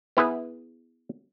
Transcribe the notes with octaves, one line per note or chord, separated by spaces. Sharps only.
B3 E4 G#4 B4